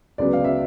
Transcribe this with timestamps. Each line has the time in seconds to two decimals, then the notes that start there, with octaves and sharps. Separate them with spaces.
0.18 C#2 C#3 F#3 B3 D5
0.33 F5
0.44 E5